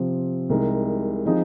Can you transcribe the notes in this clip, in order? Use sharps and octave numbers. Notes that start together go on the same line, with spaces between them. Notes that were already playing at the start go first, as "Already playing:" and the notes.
Already playing: C3 F3 C4
C2 C3 G#3 D#4 A#4
F3 C4 D#4 G#4